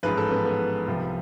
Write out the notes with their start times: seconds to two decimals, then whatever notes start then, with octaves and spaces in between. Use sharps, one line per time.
0.03 A1 G#2 F3 B4
0.18 A4
0.31 B3
0.45 B3
0.87 C2 C3 F3